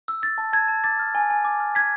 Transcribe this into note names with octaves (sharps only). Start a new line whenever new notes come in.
E6
E6 A6
A5
A5 G#6
A5
D6 A6
F6
G#5
G#5
D6
F6
G#5 G#6 B6